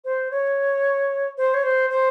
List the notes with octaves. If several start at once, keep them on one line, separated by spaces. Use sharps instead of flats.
C5
C#5
C5
C#5
C5
C5